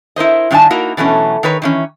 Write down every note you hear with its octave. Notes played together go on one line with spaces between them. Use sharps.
E4 A#4 C5 D#5
G2 D#3 D4 D5 G#5 A5
A#3 D#4 E4 F#4 A#4
B2 E3 F#3 A3 C#4
D#3 A#4 B4 C#5
D#3 E3 C#4